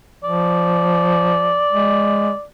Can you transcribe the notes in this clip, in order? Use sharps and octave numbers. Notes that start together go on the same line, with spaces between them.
F3 D5
G#3